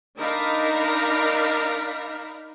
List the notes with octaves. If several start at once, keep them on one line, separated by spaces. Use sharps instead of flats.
D4 D#4 A#4 F5 A#5 B5